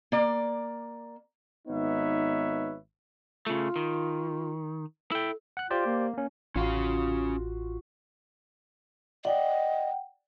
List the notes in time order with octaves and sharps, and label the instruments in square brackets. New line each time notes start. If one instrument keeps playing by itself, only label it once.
[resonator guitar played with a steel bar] A#3 D5
[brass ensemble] G#1 B3 D#4 B4 C#5 E5
[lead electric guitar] C#3 A3 [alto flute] F4
[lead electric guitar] D#3
[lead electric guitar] E4 G5 [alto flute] A4
[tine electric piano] F#5 F#6
[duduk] F4 [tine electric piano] G4 C5 D5
[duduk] A#3
[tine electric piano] A#3 C#4
[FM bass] A1 [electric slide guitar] C#4 F5 [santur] F4 F#4
[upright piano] D5 [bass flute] D#5 [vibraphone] F#5 G5